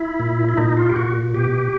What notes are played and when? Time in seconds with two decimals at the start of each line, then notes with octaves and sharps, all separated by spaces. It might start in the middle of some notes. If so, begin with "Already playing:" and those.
Already playing: E4
0.20 A#2
0.49 E4
0.57 A#2 D#4
0.77 F4
0.89 G4
0.96 A#2 F#4
1.34 B2 G4